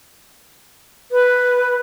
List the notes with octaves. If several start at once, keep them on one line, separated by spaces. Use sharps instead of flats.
B4